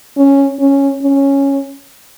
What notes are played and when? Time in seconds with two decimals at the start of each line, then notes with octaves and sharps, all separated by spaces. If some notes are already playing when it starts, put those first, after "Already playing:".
0.17 C#4
0.60 C#4
1.03 C#4